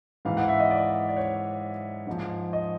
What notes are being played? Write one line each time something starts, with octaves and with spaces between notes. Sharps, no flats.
G#2 E3 F5
F#5
E5
D#5
D5
D5
C#5
G#2 F3
D#5